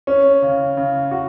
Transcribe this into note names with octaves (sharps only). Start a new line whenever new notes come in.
C#4
C#3
C#3
F#4